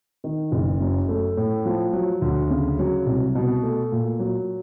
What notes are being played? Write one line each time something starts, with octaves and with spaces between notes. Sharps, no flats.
D#3
F#1
F#2
A3
A2
F3
F#3
D2
C#3
F#3
C2
B2
A3
A#2
F#3